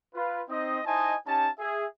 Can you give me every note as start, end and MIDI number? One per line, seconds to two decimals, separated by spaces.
0.14 0.42 65
0.14 0.42 71
0.49 0.79 60
0.49 0.79 63
0.49 0.79 75
0.86 1.14 63
0.86 1.14 64
0.86 1.14 72
0.86 1.14 75
0.86 1.14 80
0.86 1.14 81
1.26 1.49 61
1.26 1.49 63
1.26 1.49 67
1.26 1.49 81
1.59 1.85 68
1.59 1.85 76